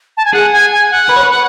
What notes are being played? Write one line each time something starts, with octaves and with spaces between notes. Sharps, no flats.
A5
G#5
G#4 F#5
G#5
G#5
F#5
B4
C#5
B4